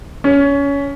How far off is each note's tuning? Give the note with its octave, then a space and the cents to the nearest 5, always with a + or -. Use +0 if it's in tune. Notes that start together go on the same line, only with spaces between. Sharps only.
C#4 +20